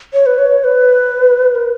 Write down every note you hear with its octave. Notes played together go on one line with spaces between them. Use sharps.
C#5
B4
C#5
B4
A#4